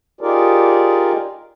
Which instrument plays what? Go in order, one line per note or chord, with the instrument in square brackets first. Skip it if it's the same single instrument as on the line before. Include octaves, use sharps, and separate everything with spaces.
[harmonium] D#4 F4 G4 G#4 A#4 D5